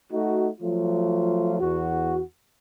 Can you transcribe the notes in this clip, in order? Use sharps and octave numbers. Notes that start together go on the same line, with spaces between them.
A3 D#4 F#4
F3 F#3 A3 F4
E2 F#4